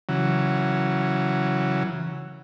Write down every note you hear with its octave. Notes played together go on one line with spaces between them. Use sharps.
C#3 E3 F#3